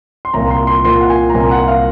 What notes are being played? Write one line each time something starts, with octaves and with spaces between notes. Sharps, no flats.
C6
C2 A#2 F3 A#5
C6
C6
C2 A#2 F3 C6
F#5
G#5
A#5
C2 A#2 F3 G#5
F#5
F5